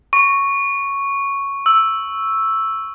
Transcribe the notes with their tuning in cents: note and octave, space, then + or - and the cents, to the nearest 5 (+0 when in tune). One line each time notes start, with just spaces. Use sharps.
C#6 +0
E6 +0